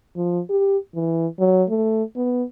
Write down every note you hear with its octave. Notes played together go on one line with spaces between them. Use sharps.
F3
G4
E3
F#3
A3
B3